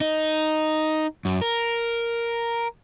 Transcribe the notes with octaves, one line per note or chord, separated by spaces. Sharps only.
D#4
F#2
A#4